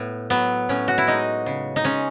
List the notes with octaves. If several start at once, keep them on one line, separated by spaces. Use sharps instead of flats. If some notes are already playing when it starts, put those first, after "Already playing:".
Already playing: A2 B3
F#3 B3
A2 C#4
F#4
E4
G#3 D#4
C#3
D#4
G#3 C#4